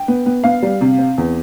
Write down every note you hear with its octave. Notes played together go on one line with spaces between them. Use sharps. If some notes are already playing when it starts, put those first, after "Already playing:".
Already playing: G5
B3
B3
B3 F5
G3
C3
C4
E2